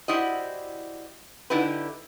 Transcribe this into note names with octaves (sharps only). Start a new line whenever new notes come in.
E4 F#4 G4 C5 D5 D#5
D3 D#4 E4 G4 B4